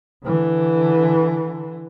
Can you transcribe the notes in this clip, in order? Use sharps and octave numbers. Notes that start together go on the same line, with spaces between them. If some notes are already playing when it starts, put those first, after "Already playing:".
D3 E3